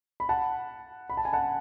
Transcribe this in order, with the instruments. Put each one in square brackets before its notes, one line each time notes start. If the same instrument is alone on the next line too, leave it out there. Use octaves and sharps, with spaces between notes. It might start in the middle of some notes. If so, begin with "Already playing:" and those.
[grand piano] B5
F#5 A5
B5
A5
G#5
F#5 A5